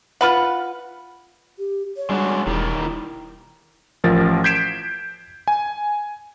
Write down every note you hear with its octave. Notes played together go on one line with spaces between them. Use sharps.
F4 B4 F#5
G4
C#5
G3 G#3 D4 F#4
E1 D#3 G3 E4
A1 F3 A#4 A6
G6 G#6 B6 C7 D7 E7
G#5